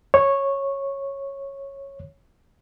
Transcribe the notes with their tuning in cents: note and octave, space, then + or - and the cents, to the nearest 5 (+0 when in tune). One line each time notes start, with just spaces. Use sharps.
C#5 -10